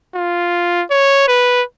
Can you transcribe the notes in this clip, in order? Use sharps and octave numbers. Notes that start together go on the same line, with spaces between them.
F4
C#5
B4